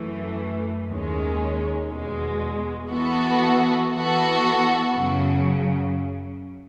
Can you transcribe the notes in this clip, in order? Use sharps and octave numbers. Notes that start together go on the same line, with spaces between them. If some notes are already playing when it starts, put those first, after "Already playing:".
Already playing: F#2 E3 A3
D#2 D#3 G#3 C#4
E2 B2 G#3
E3 B3 F#4 A4
E3 B3 F#4 A4
F#2 C#3 F#3